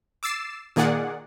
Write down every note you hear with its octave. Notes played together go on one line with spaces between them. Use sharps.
D6 E6 A6 C7 E7
A#2 D#3 A#3 G#4 D5 F#5